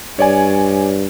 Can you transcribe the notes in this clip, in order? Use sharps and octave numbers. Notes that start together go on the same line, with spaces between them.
G2 C#5 D5 G#5